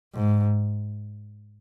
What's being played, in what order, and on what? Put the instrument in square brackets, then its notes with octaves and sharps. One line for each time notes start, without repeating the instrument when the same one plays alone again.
[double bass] G#2